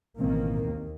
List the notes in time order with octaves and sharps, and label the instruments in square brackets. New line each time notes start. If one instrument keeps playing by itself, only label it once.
[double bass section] A1 D#3 A#3 [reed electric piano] B2 E3 C4
[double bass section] D#2